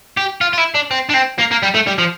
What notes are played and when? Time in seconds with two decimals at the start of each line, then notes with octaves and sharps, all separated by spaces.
0.17 G4
0.41 F4
0.53 F4
0.58 E4
0.75 D4
0.91 C4
1.09 D4
1.14 C4
1.39 A#3
1.51 A#3
1.63 G3
1.74 A3
1.87 G3
1.98 F3